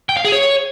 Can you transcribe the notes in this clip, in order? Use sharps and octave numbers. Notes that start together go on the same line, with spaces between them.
G5
F5
G#4
C#5